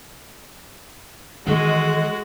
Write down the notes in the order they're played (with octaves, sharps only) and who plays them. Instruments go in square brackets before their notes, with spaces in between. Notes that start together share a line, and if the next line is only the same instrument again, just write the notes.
[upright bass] D#3 E3 [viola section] G#3 [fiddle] F#4 [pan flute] A4